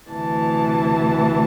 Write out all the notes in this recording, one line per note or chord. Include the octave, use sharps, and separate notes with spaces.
D2 C3 E3 A5